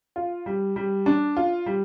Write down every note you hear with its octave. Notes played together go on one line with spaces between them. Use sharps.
F4
G3
G3
D4
F4
G3